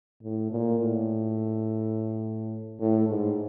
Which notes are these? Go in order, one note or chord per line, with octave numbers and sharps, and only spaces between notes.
A2
A#2
A2
A2
G#2